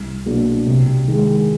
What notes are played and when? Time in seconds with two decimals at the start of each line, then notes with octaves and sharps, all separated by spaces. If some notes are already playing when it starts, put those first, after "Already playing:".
Already playing: C2
0.26 B2 F#3 A#3 D4
0.66 C3
1.08 D#3 G#3